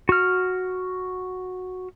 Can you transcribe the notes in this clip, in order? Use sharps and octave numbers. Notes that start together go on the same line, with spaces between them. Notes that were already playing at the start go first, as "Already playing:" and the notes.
F#4 F6